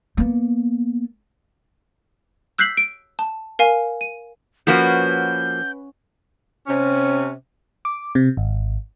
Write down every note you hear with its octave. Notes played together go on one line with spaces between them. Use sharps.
A#3 B3
E6 F#6 G6 B6 C7 F#7
D7
A5
A#4 F5 G#5
D#7
F3 A#3 C#4 F#4 B4 F#5 G6
C3 C#4
D6
C3
G#1